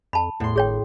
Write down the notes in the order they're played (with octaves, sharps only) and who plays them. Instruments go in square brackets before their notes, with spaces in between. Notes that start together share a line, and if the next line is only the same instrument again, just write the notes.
[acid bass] F2 [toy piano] A5 B5
[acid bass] E2 [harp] A2 C6
[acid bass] G#1 [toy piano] G#4 C#5 G5